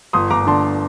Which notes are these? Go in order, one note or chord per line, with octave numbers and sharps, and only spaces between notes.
G1 C6 D#6
G1 A#5 D6
D3 A5 C6